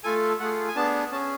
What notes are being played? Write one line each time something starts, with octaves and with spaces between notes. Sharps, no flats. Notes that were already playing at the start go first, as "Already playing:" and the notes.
A3 F4 A4 G#5
A3 F4 G#4 F#5
G#5
B3 D4 G#4 A5
C#4 G#4 A5